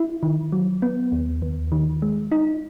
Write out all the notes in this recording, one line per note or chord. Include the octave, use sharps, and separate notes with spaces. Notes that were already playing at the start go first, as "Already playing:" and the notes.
Already playing: E4
D#3
F#3
B3
D#2
D#2
D#3
G#3
D#4